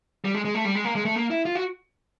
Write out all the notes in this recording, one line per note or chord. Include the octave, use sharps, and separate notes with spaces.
G3
G#3
G#3
A3
G3
G#3
A#3
G#3
A3
A#3
E4
F4
F#4